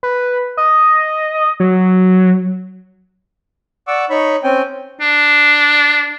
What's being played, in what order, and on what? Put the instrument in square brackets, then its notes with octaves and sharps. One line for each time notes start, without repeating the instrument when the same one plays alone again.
[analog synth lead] B4
D#5
F#3
[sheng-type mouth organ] D5 F#5 C#6 D6 E6
D#4 C#5 B5 C#6
C4 C#4 G5 G#5
[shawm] D4